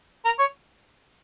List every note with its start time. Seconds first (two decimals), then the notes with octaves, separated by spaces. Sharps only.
0.25 A#4
0.39 C#5